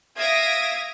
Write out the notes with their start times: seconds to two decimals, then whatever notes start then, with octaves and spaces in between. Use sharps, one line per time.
0.17 E5 F5 D#6 G#6 A#6 D7